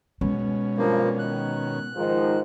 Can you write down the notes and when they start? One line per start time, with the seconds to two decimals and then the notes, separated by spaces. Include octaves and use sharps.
0.21 B2 G#3 C#4
0.78 G2 A#2 F3 A#3
1.19 D#3 F#6
1.96 G#2 D#3 F3